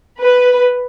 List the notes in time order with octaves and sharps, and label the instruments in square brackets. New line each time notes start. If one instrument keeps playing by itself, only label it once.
[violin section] B4